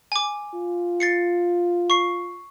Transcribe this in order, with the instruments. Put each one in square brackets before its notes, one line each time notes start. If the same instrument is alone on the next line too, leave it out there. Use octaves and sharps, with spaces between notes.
[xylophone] G#5 D6
[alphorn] F4
[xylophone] A6 C7 C#7
C#6 C7